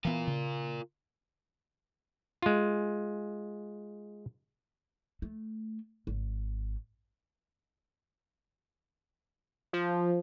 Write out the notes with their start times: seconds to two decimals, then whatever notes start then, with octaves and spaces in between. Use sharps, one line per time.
0.05 E3 B3 F4 A#4
0.27 C#3
2.42 G#3 F4
5.22 A3
6.07 G#1
9.73 F3